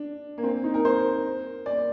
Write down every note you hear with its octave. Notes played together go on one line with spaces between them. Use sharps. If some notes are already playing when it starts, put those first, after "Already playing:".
Already playing: D4
A#3
C4
D#4
A#4
C5
D5